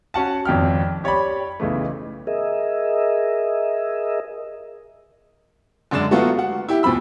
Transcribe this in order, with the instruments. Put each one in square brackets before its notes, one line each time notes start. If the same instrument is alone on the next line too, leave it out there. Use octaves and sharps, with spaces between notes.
[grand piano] C#4 F#4 F#5 A5
G#1 F2 G5 F6
G4 C#5 D5 G5 B5
B1 C#3 E3 A3
[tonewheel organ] G#4 A#4 D#5 E5
[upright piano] F#2 D3 G#3 D5 E7
F#3 A3 B3 F4 F#4
F#5
E4 G4
D2 B2 F3 B5 E6